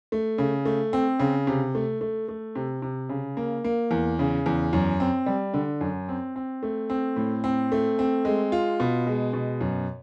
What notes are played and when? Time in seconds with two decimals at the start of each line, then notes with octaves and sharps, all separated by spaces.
0.12 A3
0.38 C#3
0.65 A3
0.93 C4
1.19 C#3
1.47 C3
1.75 A3
2.01 A3
2.28 A3
2.55 C3
2.82 C3
3.09 C#3
3.37 A#3
3.64 A#3
3.91 E2
4.19 C#3
4.46 E2
4.73 F#2
5.00 C4
5.26 G3
5.54 D3
5.81 F#2
6.09 C4
6.36 C4
6.63 A3
6.90 C4
7.16 A2
7.44 C4
7.72 A3
7.99 C4
8.25 G#3
8.52 F4
8.80 B2
9.07 G#3
9.33 B2
9.61 F#2